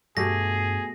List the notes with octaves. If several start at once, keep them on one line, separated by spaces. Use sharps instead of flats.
G2 B2 A3 G4 G#4 A#6